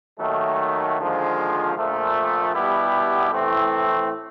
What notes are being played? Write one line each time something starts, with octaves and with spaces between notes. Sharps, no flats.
D#2 D#3 F#3 A3
D#2 D3 F3 G#3
A#1 A#2 F3 A3
B2 G3 B3 E4 G4
A2 E3 A3 C4